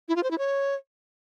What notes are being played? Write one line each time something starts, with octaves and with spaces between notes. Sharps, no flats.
E4
F4
C5
E4
C#5